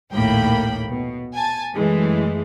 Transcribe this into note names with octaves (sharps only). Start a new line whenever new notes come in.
A#1 D#2 A2 A#3 G5 B5
B2
G#5 A5
F#2 E3 G#3 A3